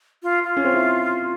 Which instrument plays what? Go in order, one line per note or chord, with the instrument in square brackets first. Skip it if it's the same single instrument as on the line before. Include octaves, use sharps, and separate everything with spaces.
[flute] F4
F4
[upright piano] C#4
C4
E4